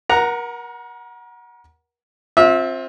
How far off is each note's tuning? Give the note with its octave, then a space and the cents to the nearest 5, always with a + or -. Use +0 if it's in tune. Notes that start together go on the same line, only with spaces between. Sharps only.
A#4 +35 F#5 +0 A#5 +0
C4 +20 F4 +25 E5 -25